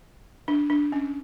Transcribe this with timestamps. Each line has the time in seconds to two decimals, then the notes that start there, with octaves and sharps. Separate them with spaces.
0.48 D4
0.70 D4
0.92 C#4